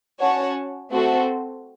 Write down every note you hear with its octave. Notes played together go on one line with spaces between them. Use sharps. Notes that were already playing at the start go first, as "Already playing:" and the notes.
C#4 F#4 C#5 F#5 A5
A3 C4 F#4 A4 C5